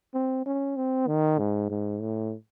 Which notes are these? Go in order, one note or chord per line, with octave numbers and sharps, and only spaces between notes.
C4
C#4
C4
D#3
G#2
G#2
A2